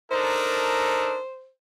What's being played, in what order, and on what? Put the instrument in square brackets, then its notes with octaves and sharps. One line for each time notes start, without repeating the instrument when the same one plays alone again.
[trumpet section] D4 D#4 A4 [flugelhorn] A#4 [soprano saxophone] C5